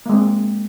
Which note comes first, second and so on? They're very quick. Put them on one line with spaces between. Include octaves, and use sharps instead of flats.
A#3 G#3 C4